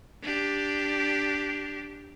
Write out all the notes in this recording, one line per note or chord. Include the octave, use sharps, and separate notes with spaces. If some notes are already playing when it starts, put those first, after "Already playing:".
D4 G4